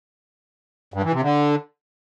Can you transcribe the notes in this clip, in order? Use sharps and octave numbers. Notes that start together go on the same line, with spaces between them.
G2
E3
C3
D3